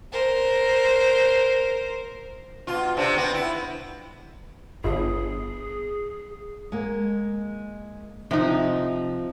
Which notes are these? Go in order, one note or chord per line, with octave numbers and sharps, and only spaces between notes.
A#4 C5
B2 F4
C3 C4 D4
B3 C4
E4
G1 G#4
G#3 A#3
C3 F3 D#4